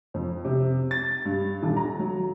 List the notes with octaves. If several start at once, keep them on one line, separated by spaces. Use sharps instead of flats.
F2
C3
A6
G2
D#1
A#5
F#3